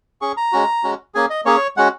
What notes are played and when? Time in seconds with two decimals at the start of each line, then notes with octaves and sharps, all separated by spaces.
0.21 C#4 G#4 C#6
0.37 A#5
0.52 G#3 C#4 F#4
0.84 G#3 C#4 F#4
1.14 A#3 C#4 G#4 G#5
1.30 D#5
1.45 A#3 C#4 G#4 C#5
1.77 G#3 C#4 F#4 F#5